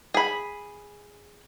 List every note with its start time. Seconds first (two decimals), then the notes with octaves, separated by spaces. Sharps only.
0.14 G#4 B5